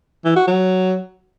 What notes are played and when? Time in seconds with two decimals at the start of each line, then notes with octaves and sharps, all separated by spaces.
0.25 E3
0.36 F#4
0.47 F#3